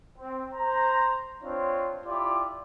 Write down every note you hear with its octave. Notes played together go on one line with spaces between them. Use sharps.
C4
C5 A#5
C4 D4 F4 C#5
E4 F4 G4 D5